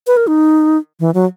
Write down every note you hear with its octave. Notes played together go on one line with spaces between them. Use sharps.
B4
A#4
D#4
E3
F#3